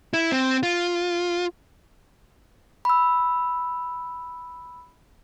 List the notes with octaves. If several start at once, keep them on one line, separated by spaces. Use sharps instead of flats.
E4
C4
F4
B5 E6